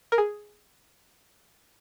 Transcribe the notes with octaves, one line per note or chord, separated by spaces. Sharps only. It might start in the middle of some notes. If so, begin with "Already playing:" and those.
A#4
G#4